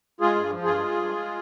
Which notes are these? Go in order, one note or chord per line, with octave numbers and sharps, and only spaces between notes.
G#3 F4 G#4
G2
F3
G2 F4 G#4
G#3
G2
G#3